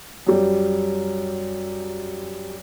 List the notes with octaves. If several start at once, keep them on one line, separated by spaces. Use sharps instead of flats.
F#2 G3